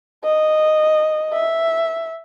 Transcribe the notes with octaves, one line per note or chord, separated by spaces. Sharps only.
D#5
E5